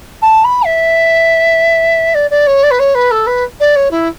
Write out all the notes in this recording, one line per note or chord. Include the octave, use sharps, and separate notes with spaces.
A5
B5
E5
D5
D5
C#5
D5
B4
C#5
B4
A4
B4
D5
C#5
E4